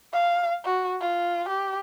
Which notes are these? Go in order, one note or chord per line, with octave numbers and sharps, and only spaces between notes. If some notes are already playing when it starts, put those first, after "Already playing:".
F5
F#4
F4
G4